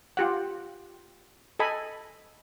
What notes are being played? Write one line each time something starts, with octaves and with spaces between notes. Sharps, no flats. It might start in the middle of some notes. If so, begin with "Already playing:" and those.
F4 G4 F#5
A4 D#5 G#5 B5